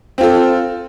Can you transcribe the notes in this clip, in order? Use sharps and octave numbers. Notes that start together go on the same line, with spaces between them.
C4 F4 A4